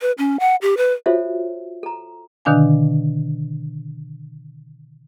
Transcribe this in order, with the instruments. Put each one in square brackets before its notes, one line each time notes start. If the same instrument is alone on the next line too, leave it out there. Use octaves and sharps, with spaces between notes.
[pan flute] B4
C#4
F#5
G4
B4
[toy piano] F4 F#4 A4 C5 C#5 E5
A4 A#5
[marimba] B2 D3 D#3 D4 F5 G#5